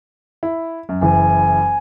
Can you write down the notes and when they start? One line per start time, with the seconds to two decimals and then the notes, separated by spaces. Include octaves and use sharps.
0.43 E4
0.89 F#2
1.01 F#1 E3 G#5